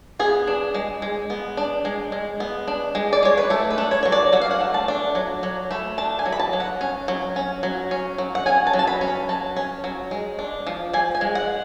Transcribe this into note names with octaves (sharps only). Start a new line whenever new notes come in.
B3 G#4
D4
G#3
G#3
B3
D4
G#3
G#3
B3
D4
G#3
D5
G#3 C#5
B4
A3 A4
B4
D4
C#5
F#3 C#5
D5
F#3 F#5
F5
F#5
A3
A5
D4
F#3
F#3
A3 B5
D4 A5
G#5
F#3
B5
A5
F#3
F#5
C#4
F#3
C#4
F#3
C#4
F#3
F#5
C#4 G#5
A5
F#3
A5
B5
C#4
B5
F#3 A5
C#4
F#3
G#3
D4
F3
F3 G#5
G#5
G#3
F#5